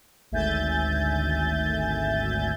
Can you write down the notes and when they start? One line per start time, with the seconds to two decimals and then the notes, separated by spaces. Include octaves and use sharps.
0.31 G#1 D2 E5 G#5 G6 A6